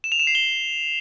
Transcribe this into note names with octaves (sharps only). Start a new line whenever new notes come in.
E7
F7
E7
C7
G7